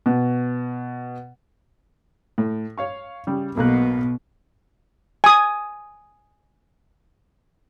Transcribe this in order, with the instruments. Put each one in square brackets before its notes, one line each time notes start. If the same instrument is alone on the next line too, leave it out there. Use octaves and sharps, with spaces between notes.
[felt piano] B2
[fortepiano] A2
C#5 F5 C#6
C#3 G3
[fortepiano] B1 A#3 F#6 [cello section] B2
[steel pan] G#5 D#6